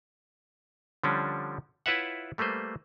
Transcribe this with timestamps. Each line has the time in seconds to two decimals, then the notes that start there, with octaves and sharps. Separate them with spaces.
1.04 D3 F3 G3 C#4 D4
1.86 E4 F4 B4 C#5 E5 F#5
2.38 G3 A3 A#3 B4 C5